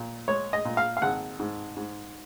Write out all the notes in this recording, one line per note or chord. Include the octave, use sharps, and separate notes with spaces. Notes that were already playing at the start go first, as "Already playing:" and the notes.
Already playing: A#2
G#3 C#5
D#5
A#2
F5
F5
G#1 F#5
G#2
G#2